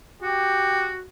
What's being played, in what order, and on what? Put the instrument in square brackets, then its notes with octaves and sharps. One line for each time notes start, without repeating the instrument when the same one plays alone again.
[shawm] F#4 [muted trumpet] G4